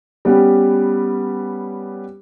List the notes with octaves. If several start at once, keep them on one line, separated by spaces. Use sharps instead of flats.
G3 B3 C#4 G4